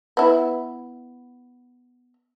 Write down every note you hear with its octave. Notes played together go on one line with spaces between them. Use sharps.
B3 E4